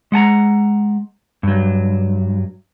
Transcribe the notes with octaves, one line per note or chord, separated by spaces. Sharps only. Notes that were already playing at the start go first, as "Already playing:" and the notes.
G#3 F#5 A5 A#5
G2 F#3